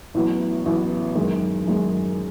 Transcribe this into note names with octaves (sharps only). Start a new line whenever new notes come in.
A1 A2 F#3 B3
A1 A2 F#3 B3
F#2 D#3 G#3
F#2 D#3 G#3